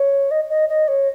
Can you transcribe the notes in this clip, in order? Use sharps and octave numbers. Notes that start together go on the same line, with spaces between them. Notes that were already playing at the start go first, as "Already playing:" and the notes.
Already playing: C#5
D#5
D#5
D#5
C#5